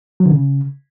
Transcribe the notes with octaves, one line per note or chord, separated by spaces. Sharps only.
F#3
D3
C#3